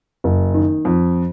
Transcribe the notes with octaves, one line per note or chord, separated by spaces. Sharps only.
F#1
D#3
F2